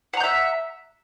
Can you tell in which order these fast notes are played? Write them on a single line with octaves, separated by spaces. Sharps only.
F#5 A#5 G6 E5